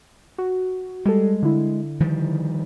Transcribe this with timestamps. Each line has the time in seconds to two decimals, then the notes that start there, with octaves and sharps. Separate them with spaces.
0.38 F#4
1.05 G3 G#3 A4
1.43 D3 E4
2.00 D#3 F3 G3